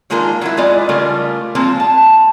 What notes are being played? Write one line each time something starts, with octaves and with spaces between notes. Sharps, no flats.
D#3 G#3 A#3 D4 F4 A#4
F#3 G#3 E4
E3 G#3 B3 F4 D5 D#5
C#3 G3 A3 F4 A#4
F3 G#3 A#3 C4 F4
A5